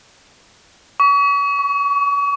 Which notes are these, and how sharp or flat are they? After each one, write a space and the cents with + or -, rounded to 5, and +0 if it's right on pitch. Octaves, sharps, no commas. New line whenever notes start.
C#6 +40
C#6 +10